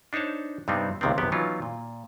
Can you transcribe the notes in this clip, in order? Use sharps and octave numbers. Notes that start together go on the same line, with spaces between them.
D4 D#4 C5 C#5 A5
G2 C3 G3 B3 C4 D#4
C#2 C3 D#3 B3 C4
G#1 F#2 C3 B3 G4
E3 F#3 B3 C#4 D#4 F4
A#2